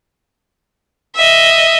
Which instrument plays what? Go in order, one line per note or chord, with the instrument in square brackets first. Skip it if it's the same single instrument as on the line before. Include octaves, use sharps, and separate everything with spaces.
[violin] D#5 E5